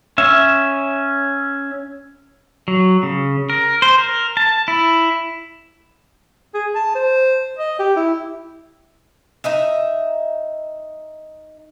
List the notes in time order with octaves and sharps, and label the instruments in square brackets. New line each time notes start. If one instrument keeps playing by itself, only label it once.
[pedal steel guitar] C#4 E5
F#3
C#3
A#4
C5
A#4
A5
E4
[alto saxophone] G#4
A5
C5
D#5
G4
E4
[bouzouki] D#4 D#5 E5